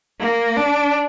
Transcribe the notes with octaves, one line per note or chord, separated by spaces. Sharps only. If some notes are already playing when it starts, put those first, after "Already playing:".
A#3
D4